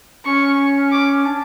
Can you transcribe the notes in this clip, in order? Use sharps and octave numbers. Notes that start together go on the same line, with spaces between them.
C#4 C#6
D6
D4